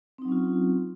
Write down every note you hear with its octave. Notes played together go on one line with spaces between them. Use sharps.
F#3 C4 C#4 D#4 F4